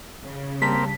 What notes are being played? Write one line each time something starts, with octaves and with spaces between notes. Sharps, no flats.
C#3
G3 A#3 C4 A5 B6